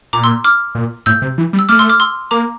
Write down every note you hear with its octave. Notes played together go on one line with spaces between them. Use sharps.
A#2 A#5 D6
C6 E6
D6 F6
A#2
A2 E6 G6
C3
E3
G3
E6
A3 D6 F6
C6 E6
D6 F6
C6 E6
A#3 A#5 D6